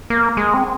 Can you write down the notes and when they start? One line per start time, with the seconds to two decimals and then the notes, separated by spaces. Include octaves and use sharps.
0.10 A#3
0.37 G#3
0.54 C4